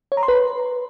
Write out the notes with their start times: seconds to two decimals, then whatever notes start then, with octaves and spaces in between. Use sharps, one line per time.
0.12 C#5
0.17 A#5
0.23 C6
0.28 B4